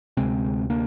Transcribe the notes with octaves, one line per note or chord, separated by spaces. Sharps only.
D2 C3 G#3 C4
A#3 D4